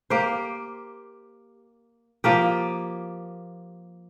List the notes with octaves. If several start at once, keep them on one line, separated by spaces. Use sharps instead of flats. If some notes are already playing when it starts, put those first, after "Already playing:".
A#3 G4 C5
F3 A#3 G4